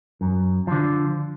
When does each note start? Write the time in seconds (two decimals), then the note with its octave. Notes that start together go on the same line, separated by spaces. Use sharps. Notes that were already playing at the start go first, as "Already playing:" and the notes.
0.21 F#2
0.67 D3 F3